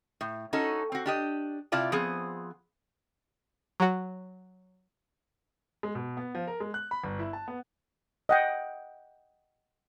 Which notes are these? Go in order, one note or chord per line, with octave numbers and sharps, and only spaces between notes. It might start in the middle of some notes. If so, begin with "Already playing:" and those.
A2
C#4 D#4 F#4 A4
C4 F#4
D4 G4 D#5
C3 E4 F4 D5 A5
F3 B3 C4 G#4
F#3 F#4
G#3
B2
B3
F3
A#4
G#3
F#6
B5
G1
E4
A5
B3
D#5 F#5 G5